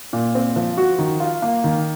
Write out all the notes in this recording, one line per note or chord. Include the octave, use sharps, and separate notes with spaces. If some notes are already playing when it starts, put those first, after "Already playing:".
A#2
C4
F3
F#4
D#3
F4
A#3
D#3